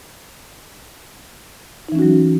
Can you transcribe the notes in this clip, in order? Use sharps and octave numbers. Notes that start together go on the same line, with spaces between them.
E3 F#3 C#4 D#4 F#4